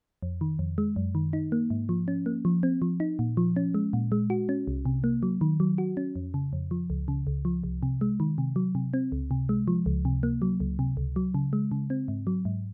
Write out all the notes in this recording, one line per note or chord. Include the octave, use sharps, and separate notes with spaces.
F2
D#3
F2
G#3
F#2
D#3
D#4
A#3
G#2
F3
C#4
A#3
F3
C4
F3
D#4
A#2
F3
C#4
G#3
A#2
G#3
F#4
C#4
C2
C3
A#3
F#3
D#3
F#3
F#4
C#4
F2
C#3
F2
F3
C#2
C#3
C#2
F3
C2
C3
G#3
D#3
C3
F#3
C3
C4
C#2
C3
G#3
F3
C#2
C3
A#3
F#3
C#2
C3
C#2
F#3
C#3
G#3
C#3
C4
G#2
F#3
G#2